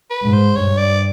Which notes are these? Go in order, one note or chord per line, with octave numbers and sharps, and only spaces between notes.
B4
G#2
C5
G2 C#5
D5